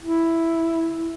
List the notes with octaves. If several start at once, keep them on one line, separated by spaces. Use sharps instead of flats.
E4